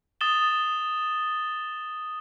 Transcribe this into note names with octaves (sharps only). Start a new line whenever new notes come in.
D#6 A6 E7 G7